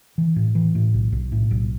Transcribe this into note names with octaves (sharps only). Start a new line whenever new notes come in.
E3
A2
E3
A2
B1
B1
A2
B1